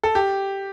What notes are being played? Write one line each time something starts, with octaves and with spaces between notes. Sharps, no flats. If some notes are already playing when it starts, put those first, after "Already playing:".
A4
G4